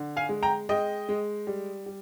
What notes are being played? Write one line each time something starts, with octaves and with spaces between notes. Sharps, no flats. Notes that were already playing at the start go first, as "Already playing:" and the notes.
Already playing: D3
F5 G#5
G#3
G5 A#5
G#3 D#5 G5
G#3
G3
G3